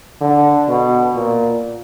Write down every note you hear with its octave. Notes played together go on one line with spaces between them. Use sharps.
D3
B2
A#2